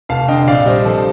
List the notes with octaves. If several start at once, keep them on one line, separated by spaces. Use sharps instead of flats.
F1 F5 A5
D3 D#5 G5
A#1 D5 F5
G3 C5 D#5
F3 A4 C5